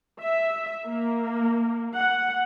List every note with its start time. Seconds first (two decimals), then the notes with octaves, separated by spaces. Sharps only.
0.20 E5
0.87 A#3
1.95 F#5